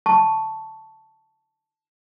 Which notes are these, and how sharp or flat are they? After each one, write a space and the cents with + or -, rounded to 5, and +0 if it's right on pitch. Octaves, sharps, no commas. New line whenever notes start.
A5 +0 C#6 +0